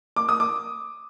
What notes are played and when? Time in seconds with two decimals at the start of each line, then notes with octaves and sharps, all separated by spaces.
0.16 D6
0.29 D#6
0.40 D6